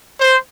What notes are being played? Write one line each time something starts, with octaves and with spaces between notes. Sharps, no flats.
C5